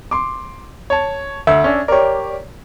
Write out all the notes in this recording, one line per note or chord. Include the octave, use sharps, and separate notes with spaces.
C6 D6
C#5 A5
D2 E5
C#4 D4
G4 A#4 C#5 D5